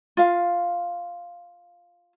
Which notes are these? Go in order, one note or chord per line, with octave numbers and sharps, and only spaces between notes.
F4 F5